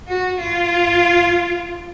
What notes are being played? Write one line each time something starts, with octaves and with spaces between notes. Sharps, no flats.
F#4
F4